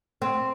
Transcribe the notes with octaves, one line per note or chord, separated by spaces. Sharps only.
C4